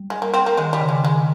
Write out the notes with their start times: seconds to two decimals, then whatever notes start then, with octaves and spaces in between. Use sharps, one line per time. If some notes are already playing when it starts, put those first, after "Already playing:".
Already playing: G3
0.10 G#3
0.22 A#3
0.34 C4
0.46 A#3
0.57 D#3 G#3
0.73 G3
0.81 C#3
0.89 G#3
1.04 D#3 G#3